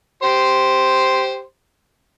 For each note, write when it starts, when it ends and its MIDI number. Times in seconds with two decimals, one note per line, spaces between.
0.23 1.42 67
0.23 1.42 72
0.23 1.42 84